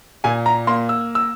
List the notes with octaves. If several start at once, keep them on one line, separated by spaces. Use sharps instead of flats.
A#2 G#5
A#5
A#3 C6
E6
E6